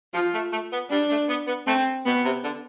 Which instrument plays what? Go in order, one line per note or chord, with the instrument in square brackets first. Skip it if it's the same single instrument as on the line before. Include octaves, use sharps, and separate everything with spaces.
[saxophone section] F3 [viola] F4
[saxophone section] A3
A3
B3
[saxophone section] G3 [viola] D4
[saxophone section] A3
B3
B3
[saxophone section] A3 [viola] C4
[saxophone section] B2 [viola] B3
[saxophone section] C3
D3